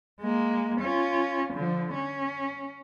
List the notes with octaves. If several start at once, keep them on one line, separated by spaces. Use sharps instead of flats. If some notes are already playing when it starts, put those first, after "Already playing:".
G#3 A#3
C#4 F4
D3 F3
C#4